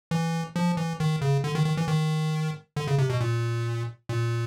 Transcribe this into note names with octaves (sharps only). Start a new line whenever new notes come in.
E3
F3
E3
D#3
C#3
D3
D#3
D#3
E3
D#3
D3
C#3
C3
B2
A#2
A#2